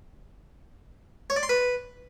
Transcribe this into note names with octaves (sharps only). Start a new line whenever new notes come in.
C#5
D5
C6
B4